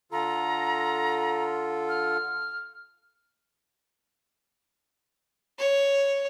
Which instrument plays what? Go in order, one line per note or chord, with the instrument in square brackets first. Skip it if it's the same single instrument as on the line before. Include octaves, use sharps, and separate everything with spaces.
[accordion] D3 F4 A4 [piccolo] A#5
[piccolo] F6
[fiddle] C#5